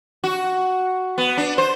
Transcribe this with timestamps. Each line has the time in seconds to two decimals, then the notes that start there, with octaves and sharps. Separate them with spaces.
0.24 F#4
1.18 B3
1.37 D4
1.58 C5